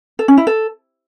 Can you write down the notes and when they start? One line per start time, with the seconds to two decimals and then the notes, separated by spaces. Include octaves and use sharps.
0.19 A4
0.28 C#4
0.37 E4
0.47 A4